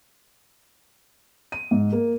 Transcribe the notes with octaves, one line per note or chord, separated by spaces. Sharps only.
D#7
G#2
A#3